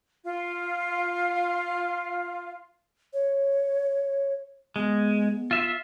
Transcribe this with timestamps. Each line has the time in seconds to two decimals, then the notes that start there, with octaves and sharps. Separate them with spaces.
0.24 F4 F5
3.13 C#5
4.76 G#3 B3
5.51 F4 E5